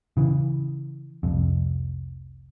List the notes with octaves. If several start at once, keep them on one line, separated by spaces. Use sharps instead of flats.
C#3 E3
F1 C2 F2